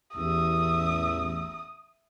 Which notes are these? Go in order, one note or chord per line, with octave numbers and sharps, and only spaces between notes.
A1 E2 E5 D#6